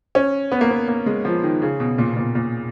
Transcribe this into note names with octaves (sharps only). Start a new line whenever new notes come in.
C#4
B3
A#3
B3
A#3
G#3
F3
D#3
C#3
B2
A#2
B2
A#2
A#2